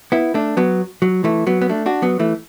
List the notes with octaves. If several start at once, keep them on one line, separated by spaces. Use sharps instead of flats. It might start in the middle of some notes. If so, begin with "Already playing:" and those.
B3 E4
A3 D4
F#3 B3
F#3
E3 A3
F#3 B3
B3
A3 D4
D4 F#4
F#3 B3
E3 A3